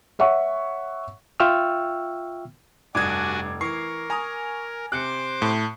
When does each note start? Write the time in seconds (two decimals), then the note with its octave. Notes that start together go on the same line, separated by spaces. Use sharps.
0.19 C#5 E5 F#5 C#6
1.40 F4 E5 G5 C#6 E6 F6
2.95 F1 G2 D4 F#4 G#5 D6 D#6 G#6
3.61 E3 A#4 C#6 C7
4.10 G#5 A#5 D#6
4.92 C3 C5 D6 F#6 C#7
5.42 A2 A5